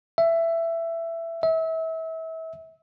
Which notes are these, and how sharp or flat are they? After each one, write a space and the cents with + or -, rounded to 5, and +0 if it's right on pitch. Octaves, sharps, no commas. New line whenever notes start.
E5 +15
E5 -30